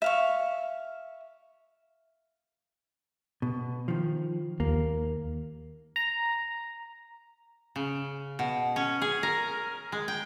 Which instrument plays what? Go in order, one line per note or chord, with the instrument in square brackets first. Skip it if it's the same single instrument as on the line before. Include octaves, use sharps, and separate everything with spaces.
[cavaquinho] E5 F5 C#6
[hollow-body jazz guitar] B2
D#3 F3
[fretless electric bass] D#2 [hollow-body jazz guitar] A#3
[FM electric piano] A#5
[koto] C#3
B2
C#4
G#4
A#4
G#3
G5